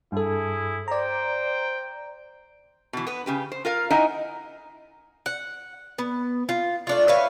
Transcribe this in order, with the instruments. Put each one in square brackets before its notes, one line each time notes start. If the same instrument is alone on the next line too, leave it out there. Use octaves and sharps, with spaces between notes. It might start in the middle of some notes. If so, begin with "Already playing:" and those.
[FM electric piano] G2 A4 [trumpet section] E4 G#4
[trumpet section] C5 G5 [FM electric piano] D5 A#5
[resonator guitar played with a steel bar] B2 E3
B3 B4
C#3 G4 B4
C5
F4 A#4 F5
D#4 E4 D#5 E5 F#5 G#5
[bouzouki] F#5
B3
F4
A3 D4 F4
B4 C#5 E5 F5